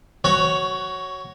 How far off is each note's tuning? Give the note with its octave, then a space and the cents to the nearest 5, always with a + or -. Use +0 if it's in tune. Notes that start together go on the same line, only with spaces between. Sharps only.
F#4 +15 C#5 +0